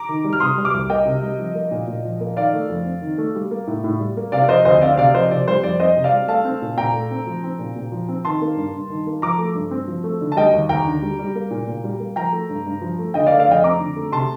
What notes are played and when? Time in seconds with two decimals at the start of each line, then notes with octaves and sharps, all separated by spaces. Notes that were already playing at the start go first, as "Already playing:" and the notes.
Already playing: A#5 D6
0.09 D#3
0.24 G3
0.33 F6
0.40 C3 C6 D#6
0.57 G3
0.65 D6 F6
0.74 C2
0.90 A#3 D#5 G5
1.05 C3
1.22 G3
1.39 F3
1.55 A#3
1.71 A#2
1.87 A#2
2.05 F3
2.21 A#3
2.37 D#3 D5 F5
2.53 A3
2.69 F2
2.85 C4
3.02 D#3
3.18 A3
3.35 G3
3.51 A#3
3.67 A2
3.84 A2
4.00 G3
4.17 A#3
4.32 C3 D5 F5
4.43 D5
4.48 F3 C5 D#5
4.65 D2 C5 D#5
4.81 C4 D5 F5
4.97 C3 D5 F5
5.14 F3 C5 D#5
5.31 C3 D5
5.48 G3 C5
5.63 F2 D5
5.80 C4 C5 D#5
5.96 C3
6.04 D5 F5
6.12 G3
6.28 A3 F5 A5
6.45 C4
6.62 A#2
6.77 A#2 G5 A#5
6.93 A3
7.11 C4
7.27 F3
7.44 C4
7.59 A#2
7.76 A#2
7.92 F3
8.09 C4
8.25 D#3 A5 C6
8.42 A#3
8.57 G2
8.74 G2
8.90 D#3
9.07 A#3
9.22 F3 A#5 D6
9.38 A3
9.55 G2
9.71 C4
9.87 F3
10.04 A3
10.21 D3
10.32 A5
10.36 G3 D#5 G5
10.54 D#2
10.69 D#2 G5 A#5
10.86 D3
11.02 G3
11.19 G3
11.35 A#3
11.51 A#2
11.67 A#2
11.84 G3
12.00 A#3
12.16 F3 G5 A#5
12.32 A3
12.50 G2
12.66 G2
12.82 F3
12.99 A3
13.14 D3 D#5 G5
13.27 D5 F5
13.32 A3
13.40 D5 F5
13.48 F2 D#5 G5
13.64 C4 A#5 D6
13.79 D3
13.96 A3
14.12 C3 A5 C6